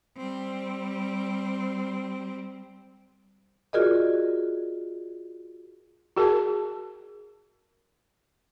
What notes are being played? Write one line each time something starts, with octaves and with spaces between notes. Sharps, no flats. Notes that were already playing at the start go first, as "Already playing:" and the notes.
G3 C4
F4 F#4 G#4 A#4 D5 D#5
F#4 G#4 A#4 A5